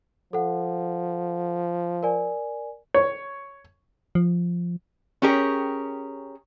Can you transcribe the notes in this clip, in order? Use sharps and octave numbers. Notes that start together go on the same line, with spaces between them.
F3 A4 F#5
A#4 D5 G#5
C#5
F3
C#4 G4 G#4 A#4 C#5